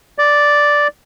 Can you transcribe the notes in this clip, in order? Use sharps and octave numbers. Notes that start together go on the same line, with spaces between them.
D5